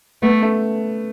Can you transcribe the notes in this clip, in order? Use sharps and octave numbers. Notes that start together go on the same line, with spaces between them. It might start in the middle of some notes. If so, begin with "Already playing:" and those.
A3 B3
A3